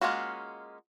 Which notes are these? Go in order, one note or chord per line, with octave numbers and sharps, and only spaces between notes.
G#3 A#3 C#4 F4 F#4